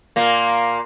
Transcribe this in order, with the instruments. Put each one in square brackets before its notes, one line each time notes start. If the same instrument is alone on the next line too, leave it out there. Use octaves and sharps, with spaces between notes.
[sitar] A#2 A#3